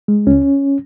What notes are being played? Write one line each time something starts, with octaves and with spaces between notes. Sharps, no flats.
G#3
C#2 C#4